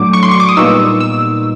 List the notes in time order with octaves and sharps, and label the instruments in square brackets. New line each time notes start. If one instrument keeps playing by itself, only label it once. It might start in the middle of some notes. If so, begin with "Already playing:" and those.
Already playing: [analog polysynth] A2 F#3 A3 D4 D6
C#6
C6
C#6
D6
D#6
A#2 G3 B3 D#4 E6
E6